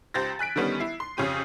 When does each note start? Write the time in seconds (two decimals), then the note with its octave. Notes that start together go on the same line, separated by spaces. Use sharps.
0.14 C#2 G4 C5 A6 A#6
0.39 G#5 F#6 B6 D7
0.56 D3 D#3 G3 B3 C#4
0.80 E4 C7
1.00 C6
1.17 F2 C#3 C#4 G4 D#7